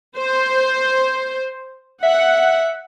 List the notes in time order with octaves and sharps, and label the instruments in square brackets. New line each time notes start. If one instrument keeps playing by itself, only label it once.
[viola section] C5
[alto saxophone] E5 [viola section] F#5